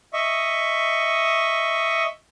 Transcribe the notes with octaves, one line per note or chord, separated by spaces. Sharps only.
D#5 E5 C#6